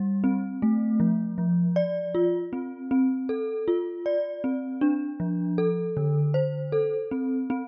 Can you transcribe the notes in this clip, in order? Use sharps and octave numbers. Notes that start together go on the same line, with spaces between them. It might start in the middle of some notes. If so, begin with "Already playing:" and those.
Already playing: G3
C4
A3
F3
F3
D5
F4
C4
C4
A4
F4
D5
C4
D4
F3
A4
D3
C5
A4
C4
C4